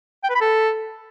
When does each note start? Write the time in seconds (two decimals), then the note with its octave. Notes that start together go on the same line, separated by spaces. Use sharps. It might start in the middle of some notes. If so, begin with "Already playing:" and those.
0.24 G5
0.30 B4
0.35 B5
0.41 A4